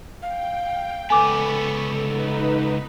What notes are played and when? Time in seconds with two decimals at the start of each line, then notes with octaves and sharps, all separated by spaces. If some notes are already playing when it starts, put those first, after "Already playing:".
0.22 F5 G5
1.10 C#2 B3 A4 G#5 B5 C#6 D6
2.05 D#4 B4